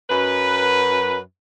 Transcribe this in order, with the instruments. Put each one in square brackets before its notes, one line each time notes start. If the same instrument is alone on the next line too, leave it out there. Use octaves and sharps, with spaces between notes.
[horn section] F#2 B4